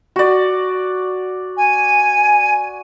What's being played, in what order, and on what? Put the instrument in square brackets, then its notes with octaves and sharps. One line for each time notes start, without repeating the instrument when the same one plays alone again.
[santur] F#4 D5
[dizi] G#5